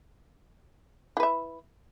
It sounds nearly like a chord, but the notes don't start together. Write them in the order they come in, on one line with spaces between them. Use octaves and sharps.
E4 B4 E5